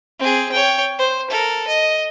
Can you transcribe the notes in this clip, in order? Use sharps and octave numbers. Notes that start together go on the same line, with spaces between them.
C4 G#4
C#5 G5
C5
A4 A#4
D#5